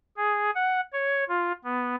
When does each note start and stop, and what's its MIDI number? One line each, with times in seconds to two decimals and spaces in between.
0.17 0.51 68
0.55 0.81 78
0.93 1.24 73
1.29 1.52 65
1.65 1.96 59